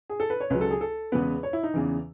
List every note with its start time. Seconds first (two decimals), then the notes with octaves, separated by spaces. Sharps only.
0.10 G#4
0.20 A4
0.30 B4
0.40 C#5
0.50 C#2 C#3 F#3 B4
0.61 A4
0.71 G#4
0.81 A4
1.12 E2 C#3 G#3 B3 B4
1.43 C#5
1.53 E4
1.63 D#4
1.74 E2 C#3 E3